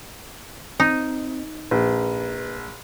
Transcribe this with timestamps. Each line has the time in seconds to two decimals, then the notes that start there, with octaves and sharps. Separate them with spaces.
0.80 C4 D#4
1.71 A#1 B4